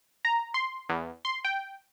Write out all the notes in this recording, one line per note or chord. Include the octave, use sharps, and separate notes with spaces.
A#5
C6
E2
C6
G5